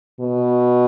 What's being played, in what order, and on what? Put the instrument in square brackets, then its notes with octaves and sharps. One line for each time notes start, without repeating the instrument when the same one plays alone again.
[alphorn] B2